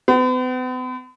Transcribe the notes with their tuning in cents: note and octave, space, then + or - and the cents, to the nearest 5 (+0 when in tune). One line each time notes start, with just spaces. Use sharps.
B3 +45